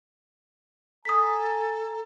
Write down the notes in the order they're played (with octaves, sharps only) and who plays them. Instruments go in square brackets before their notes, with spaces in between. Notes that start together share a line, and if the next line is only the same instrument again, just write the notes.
[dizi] A4 [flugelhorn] G#5 [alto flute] A#5 [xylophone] D#6 B6